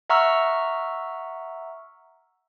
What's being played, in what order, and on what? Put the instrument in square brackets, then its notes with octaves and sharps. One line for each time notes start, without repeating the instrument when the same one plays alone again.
[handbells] E5 F#5 A#5 C#6 E6 F6